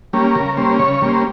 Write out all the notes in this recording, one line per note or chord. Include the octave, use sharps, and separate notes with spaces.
G3 A#3 C#4
C#3 A#4
G3 A#3 C#4 C5
C#3 C#5
C#5
G3 A#3 C#4
C5